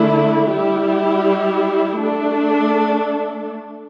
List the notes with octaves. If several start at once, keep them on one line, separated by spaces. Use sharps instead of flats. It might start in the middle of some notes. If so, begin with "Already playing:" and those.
Already playing: D3 A3 E4
G3 E4 G4
A3 D4 A4